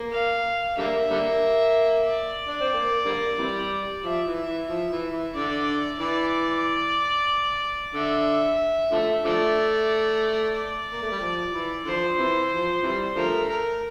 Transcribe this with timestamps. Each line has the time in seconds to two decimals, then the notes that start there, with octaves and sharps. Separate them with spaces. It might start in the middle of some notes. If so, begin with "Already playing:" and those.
Already playing: A#3
0.12 F5
0.78 D3 G3 A#3 E5
1.10 D3 G3 A#3
2.08 D5
2.48 D4
2.61 C4
2.74 A#3
3.06 D3 G3 A#3
3.39 C3 E3 G3
4.04 F3 E5
4.26 E3
4.47 E3
4.68 F3
4.91 E3
5.12 E3
5.34 D3 D5
5.99 E3 D5
7.94 D3 E5
8.92 D3 F3 A3
9.25 D3 F3 A3 D5
10.55 D5
10.93 A#3
11.02 A3
11.11 G3
11.20 F3
11.53 E3
11.85 D3 F3 C5
12.18 C3 E3
12.51 F3
12.83 C3 E3 G3
13.16 D3 F3 A3 A#4
13.48 A#4